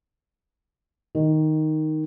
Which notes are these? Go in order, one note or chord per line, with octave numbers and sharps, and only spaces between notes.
D#3